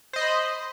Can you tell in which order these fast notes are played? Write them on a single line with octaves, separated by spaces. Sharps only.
C5 D#5 C6 B5